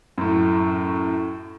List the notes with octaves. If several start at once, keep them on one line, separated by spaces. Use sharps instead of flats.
F#2 A2